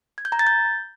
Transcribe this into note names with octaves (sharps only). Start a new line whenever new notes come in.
G#6
G6
A#5
A6
G6